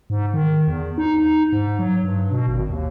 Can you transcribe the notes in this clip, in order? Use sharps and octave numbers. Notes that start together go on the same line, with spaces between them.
G#2
D#3
E2
D#4
G#2
F#3
G2
B2
G#1
D#2